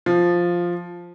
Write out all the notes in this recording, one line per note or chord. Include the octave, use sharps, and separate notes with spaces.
F3